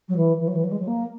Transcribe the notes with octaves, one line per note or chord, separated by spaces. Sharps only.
F#3
E3
E3
F#3
E3
F#3
G#3
F#3
A#3